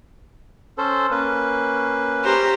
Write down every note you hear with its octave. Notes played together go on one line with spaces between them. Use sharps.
C#4 A4 C5
A#3 C#4 B4
G4 C5 A#5